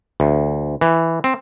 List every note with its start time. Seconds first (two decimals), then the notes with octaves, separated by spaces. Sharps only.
0.20 D2
0.81 E3
1.24 C4